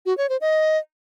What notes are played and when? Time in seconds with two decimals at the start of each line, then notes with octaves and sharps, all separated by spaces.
0.06 F#4
0.18 C#5
0.29 C5
0.41 D#5